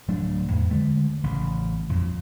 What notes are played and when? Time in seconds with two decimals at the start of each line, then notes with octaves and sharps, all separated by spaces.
0.08 D1 F#3 A3 D4
0.49 E2 A2
0.70 D3 G#3 A3
1.24 A1 C#3
1.89 F2 A#2